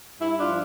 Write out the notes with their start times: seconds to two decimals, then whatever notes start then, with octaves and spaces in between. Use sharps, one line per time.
0.21 G2 E4
0.38 D4 F4
0.48 F3